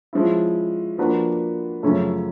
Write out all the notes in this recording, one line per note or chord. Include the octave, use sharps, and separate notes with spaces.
F3 G#3 C#4 E4
F3 A#3 D4 F#4 B4
F#2 C#3 F3 A3 C#4